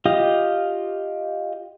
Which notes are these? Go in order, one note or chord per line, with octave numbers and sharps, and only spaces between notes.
F4 G4 D#5 D#6